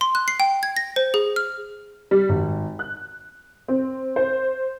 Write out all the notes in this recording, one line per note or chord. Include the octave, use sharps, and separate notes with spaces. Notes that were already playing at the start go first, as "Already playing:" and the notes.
C6
F#6
C7
G5
G#6
A#6
C5
G#4
F6
G3
G#1
F#6
C4
C5